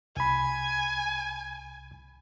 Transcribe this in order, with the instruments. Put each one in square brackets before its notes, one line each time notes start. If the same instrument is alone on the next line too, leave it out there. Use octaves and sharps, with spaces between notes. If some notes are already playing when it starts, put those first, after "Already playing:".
[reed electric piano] C2 B5 [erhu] G#5